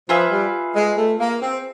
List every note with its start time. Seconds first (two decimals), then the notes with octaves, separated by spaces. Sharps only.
0.09 F3 F4 G#4 B4 E5
0.31 G3
0.76 G#3
0.98 A3
1.20 A#3
1.42 C4